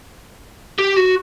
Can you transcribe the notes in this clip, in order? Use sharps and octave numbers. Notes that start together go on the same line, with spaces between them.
G4
F#4